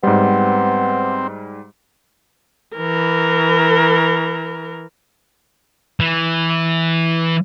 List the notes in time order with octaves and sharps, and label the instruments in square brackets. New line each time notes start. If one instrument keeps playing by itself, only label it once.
[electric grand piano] G#2 G3 [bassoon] B3 [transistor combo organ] C4
[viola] E3 A#4
[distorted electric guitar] E3